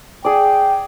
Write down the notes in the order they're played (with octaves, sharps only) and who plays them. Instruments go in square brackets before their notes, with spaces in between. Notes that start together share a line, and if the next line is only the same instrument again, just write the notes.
[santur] G#4 D5 [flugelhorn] G5